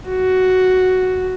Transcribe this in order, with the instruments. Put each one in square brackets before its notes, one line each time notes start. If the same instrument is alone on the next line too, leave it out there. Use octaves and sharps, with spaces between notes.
[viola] F#4